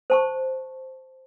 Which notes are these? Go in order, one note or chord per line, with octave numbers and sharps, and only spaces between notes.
C5 A5 C#6